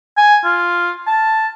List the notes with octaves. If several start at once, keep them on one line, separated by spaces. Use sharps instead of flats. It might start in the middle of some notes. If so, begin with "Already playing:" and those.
G#5
F4
A5